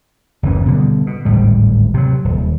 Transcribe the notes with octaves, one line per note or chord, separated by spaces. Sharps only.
F#1 D2 E3 C#4
B2 D3 G3
B2
G#1 D2 A2 G3
C3 F#3
D#1